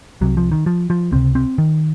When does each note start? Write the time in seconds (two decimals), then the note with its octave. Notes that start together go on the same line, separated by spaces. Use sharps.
0.21 C2 C3 F#3
0.37 F3
0.51 D#3
0.66 F3
0.90 F3
1.12 C#2 C3 C4
1.35 C4
1.58 D#3